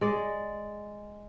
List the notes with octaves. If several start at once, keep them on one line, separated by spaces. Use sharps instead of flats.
G#3 D5